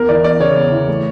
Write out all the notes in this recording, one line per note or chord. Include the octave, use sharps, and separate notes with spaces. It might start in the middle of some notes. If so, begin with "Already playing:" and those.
Already playing: E2 A#4
E3 D5
E2 D5
C#3 C#5
E2
E3
A3